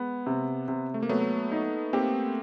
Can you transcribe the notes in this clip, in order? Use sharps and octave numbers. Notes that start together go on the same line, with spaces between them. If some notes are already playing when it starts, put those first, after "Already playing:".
Already playing: G#3 B3
C3
C3
A3
A#3
F#3 A3 B3
D#4
A#3 C4 G4